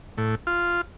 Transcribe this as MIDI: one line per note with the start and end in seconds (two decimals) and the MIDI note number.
0.18 0.35 45
0.47 0.81 65